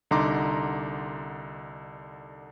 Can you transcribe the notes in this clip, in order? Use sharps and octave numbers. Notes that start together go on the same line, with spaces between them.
C2 D3 D#4 A#5 C6 D6